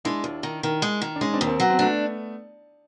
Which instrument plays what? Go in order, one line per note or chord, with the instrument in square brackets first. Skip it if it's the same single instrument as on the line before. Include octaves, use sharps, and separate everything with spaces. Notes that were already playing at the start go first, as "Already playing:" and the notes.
[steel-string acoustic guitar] G#3 [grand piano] D4 E4
[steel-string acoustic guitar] D#2
D#3
D#3
G#3
D#3
[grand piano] D4
[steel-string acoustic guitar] G#3 [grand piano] C#4 D#4
[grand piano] C4 D4
[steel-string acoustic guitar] D#2
[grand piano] A#3 C4
[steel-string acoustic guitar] F#3 [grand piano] B3
[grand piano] C4
[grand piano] A3 B3 [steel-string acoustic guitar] D4